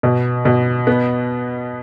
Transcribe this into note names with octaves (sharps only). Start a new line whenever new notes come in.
B2
B2
B3